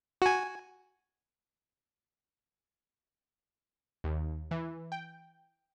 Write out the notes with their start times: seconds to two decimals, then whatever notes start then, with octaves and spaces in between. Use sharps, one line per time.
0.22 F#4 G#5
4.04 D#2
4.51 E3
4.92 G5